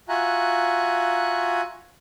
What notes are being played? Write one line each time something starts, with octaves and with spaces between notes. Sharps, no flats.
F4 F#4 E5 G#5 A#5 F#6